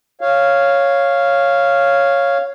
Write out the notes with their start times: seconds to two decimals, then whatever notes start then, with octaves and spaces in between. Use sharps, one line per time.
0.21 C#5 F5